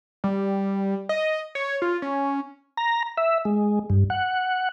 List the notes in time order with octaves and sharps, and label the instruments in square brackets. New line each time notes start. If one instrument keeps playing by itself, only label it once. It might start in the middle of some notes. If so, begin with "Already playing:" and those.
[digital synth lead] G3
D#5
C#5
F4
C#4
[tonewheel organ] A#5
E5
G#3
G2
F#5